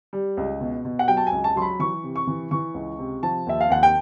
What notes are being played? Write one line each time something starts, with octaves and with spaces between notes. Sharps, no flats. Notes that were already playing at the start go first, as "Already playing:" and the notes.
G3
C#2
B2
B2
F#5
F#3 G5
A5
G#5
C#2
A5
F#3 C6
B5
E3 C#6
C3
C#6
E3
E3 C#6
C#2
C3
F3 A5
D#2 E5
F5
D#2 F#5
G5